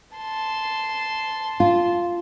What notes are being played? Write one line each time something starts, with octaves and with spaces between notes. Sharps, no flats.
A5 C6
F4